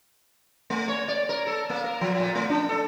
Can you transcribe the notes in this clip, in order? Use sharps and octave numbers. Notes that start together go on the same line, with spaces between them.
A3
C#5
D5
A#4
A4
A#3
A#4
F3
A#2
A3
D4
A4